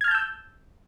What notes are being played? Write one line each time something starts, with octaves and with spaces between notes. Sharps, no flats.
A5 E6 F6 G6 G#6